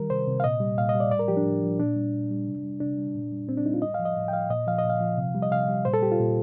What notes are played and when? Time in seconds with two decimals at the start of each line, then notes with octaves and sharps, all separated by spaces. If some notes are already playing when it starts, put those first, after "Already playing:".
Already playing: D#3 G3 A#4
0.10 C3 C5
0.27 C3
0.40 F5
0.44 A#2 D#5
0.60 G3
0.78 A#2 F5
0.89 D#5
0.95 G3
1.00 D5
1.11 A2 D5
1.19 A#4
1.28 F3 G4
1.37 D4
1.46 A2
1.63 F3
1.79 A#2 D4
1.96 G3
2.14 A#2
2.31 G3
2.47 C3
2.64 G3
2.81 C3 D4
2.98 G3
3.15 A#2
3.32 G3
3.49 A#2 C4
3.57 D4
3.65 G3 D#4
3.74 F4
3.82 A2 D#5
3.94 F5
4.00 F3
4.05 D#5
4.17 A2
4.28 G5
4.33 F3 F5
4.50 A#2 D#5
4.67 F3 F5
4.79 D#5
4.84 A#2
4.90 F5
5.01 F3
5.18 C3
5.35 G3
5.42 D#5
5.51 C3 F5
5.69 G3
5.85 A#2 C5
5.94 A4
6.02 G3 G4
6.12 F4
6.20 A#2